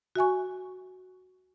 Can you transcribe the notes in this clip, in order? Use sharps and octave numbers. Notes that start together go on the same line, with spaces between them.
F#4 E5 G#5 C#6